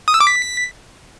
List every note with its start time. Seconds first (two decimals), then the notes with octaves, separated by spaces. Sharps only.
0.08 D#6
0.14 E6
0.20 D6
0.27 B6